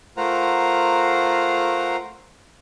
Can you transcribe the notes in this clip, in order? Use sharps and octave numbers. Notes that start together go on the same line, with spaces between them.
A3 F4 A#4 C5 F#5 A#5